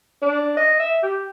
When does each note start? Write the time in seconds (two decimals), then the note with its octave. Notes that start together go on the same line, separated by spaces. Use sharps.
0.22 D4
0.57 D#5
0.80 E5
1.03 G4